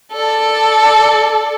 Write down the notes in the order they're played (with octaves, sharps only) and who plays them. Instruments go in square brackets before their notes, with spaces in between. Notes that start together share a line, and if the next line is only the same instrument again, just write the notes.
[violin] A4 D5